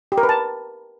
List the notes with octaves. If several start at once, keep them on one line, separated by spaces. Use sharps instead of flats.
G4
A#4
B4
A5